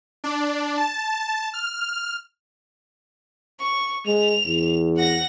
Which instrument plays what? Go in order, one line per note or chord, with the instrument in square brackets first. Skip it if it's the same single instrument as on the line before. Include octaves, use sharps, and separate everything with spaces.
[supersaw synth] D4
A5
F6
[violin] C#6
[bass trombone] G#3 [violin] F7
[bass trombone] E2
[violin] F#5 A#6